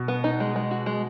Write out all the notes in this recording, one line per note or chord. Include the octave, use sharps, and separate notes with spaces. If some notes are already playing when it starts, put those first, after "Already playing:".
Already playing: B2
B3
D#4
G#3
G#3
F#4
G#3